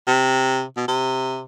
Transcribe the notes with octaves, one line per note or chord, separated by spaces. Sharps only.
C3
B2
C3